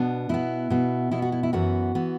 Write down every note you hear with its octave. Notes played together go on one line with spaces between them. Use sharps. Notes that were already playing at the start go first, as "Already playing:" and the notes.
Already playing: B2 B3 D4
B2 B3 E4
B2 B3
B2 B3 E4
F#4
E4
E4
F#2 E3 B3 F#4
E3 B3